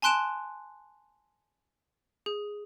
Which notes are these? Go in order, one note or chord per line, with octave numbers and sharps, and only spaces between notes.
G#5 A5 C6 F#6 D7 E7
G#4